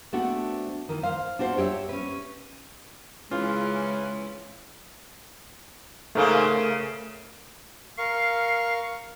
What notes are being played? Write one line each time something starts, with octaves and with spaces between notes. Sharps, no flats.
A3 B3 C4 D4 F#4
D#3 E3
C5 F5
D4 F4 F#4 C5
G4 C#5 D5 E5
C#4 B4
C#3 E3 G#3 C#4 E4 F4
G#2 C#3 A3 A#3 A#4
C#3
A#4 F5 C#6 C7